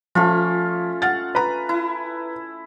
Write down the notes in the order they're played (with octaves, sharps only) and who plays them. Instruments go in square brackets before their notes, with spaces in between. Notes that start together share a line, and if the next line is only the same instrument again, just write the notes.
[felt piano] F3 [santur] A3 C#4 F4
[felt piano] F#5 F6 A6
B4 A#5
[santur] E4